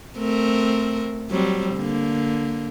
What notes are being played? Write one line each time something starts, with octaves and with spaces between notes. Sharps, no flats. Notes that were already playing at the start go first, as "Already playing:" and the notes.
A3 C4 A#4
F#3 G3 C4
D3 A#3